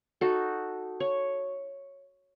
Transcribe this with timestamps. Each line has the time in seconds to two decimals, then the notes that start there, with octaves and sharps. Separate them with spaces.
0.21 D#4 F#4 A4
1.00 C#5